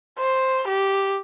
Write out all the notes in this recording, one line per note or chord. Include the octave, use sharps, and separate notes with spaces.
C5
G4